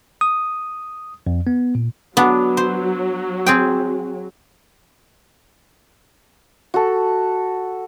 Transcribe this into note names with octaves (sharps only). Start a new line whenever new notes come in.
D#6
F2
B3
A#2
F#3 B3 D4
C5
C4 G#4 G5
F#4 A4